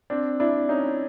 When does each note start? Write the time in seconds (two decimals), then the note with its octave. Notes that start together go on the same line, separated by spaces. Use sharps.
0.10 C4 D4
0.40 D4 E4
0.69 C#4 D#4